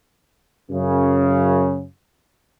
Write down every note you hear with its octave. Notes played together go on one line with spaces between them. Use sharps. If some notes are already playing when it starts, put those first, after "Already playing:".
F#2 C#3